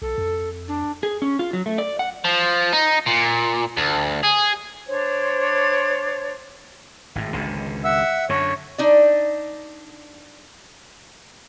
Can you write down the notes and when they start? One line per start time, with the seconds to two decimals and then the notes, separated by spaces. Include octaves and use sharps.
0.02 B1 A4
0.18 F2
0.68 D4
1.03 G#4
1.22 C#4
1.39 F4
1.53 F#3
1.66 A3
1.78 D5
1.99 F#5
2.25 F3
2.73 D#4
3.06 A#2
3.77 D2
4.23 G#4
4.88 D4 C5 C#5
7.15 G#1 A2
7.33 G#1 C#2 D3
7.84 E5 F#5 E6
8.29 F#2 D3 C#5
8.78 D4 D#4 D5